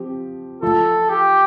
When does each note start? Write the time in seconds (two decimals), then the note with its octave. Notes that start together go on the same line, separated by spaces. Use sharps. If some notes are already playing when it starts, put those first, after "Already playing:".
Already playing: F3 C4 G4
0.62 F3 A3 F4 A4
1.09 G4